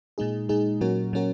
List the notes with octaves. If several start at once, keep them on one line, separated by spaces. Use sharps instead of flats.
A#2 G#3 D#4 G#4
A#2 G#3 D#4 G#4
A#2 F#3 C#4 F#4 A#4
A#2 F#3 C#4 F#4 A#4